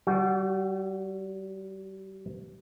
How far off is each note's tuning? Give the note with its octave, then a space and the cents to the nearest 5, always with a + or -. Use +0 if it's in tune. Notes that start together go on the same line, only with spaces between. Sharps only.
G3 -35 F#4 +0